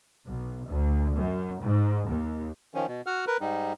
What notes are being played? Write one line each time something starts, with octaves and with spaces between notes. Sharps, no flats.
B1
D2
F#2
G#2
D#2
D#3 F3 C#4
B2
F#4 F#5 F6
A#4 B4
G#2 G3 D#4